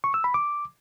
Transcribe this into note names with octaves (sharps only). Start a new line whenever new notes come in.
C#6
E6
B5
D6